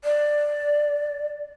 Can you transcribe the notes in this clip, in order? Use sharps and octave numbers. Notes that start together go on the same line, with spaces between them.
D5